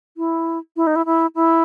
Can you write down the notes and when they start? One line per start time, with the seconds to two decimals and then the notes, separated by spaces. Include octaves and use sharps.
0.17 E4
0.76 E4
0.87 D#4
0.96 E4
1.06 E4
1.35 E4